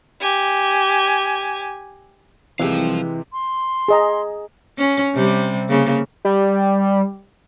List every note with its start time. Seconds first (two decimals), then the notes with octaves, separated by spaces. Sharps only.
0.21 G4 G#5
2.59 C2 C3 E3 F3 G3 G#3 G4 F5
3.33 C6
3.88 G#4 D#5 A#5
4.78 C#4
5.14 C3 G3
5.68 C#3 A#3
6.25 G3